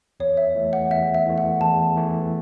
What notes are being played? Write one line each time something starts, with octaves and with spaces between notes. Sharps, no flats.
E2 C#5
E5
E3 A3
F#5
E2 E5
E5
E3 A3
F#5
E2 A5
E3 A3